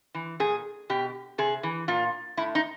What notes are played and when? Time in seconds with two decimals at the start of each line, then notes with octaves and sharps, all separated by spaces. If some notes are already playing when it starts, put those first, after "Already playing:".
0.14 E3
0.40 A#2 G#4
0.90 B2 G4
1.38 C3 G#4
1.63 E3
1.88 A#2 F4
2.37 A2 E4
2.55 D#4